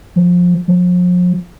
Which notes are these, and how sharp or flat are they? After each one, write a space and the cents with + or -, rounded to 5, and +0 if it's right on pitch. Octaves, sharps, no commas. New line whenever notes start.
F3 +20
F3 +40